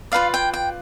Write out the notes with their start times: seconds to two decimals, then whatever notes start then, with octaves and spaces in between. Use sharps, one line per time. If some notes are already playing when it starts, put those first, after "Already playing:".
0.12 F4 B4 D5 F5
0.34 G5
0.54 G5